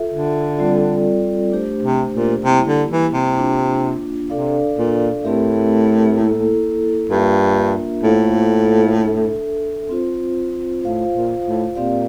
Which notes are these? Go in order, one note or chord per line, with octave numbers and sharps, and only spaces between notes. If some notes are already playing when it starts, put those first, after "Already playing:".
Already playing: F4 A4 E5
D3
G3 C4 F4 A4 D5
A3 D4 G4 C5
C3
A#2
C3 G3 A#3 E4 G4
D3
E3
C3
A#3 D4 F4
C3 D4 A4 D5 F5
A#2
A2 A3 C4 G4 A#4 E5
A#3 E4 A4
G2 A#3 D4 F4 A#4 E5
A2 A#3 F4 A4 C5 F5
D4 A4 E5
C4 F4 C5
A2 F4 C5 F5
A#2
A2
A#2 C4 G4 D5 F5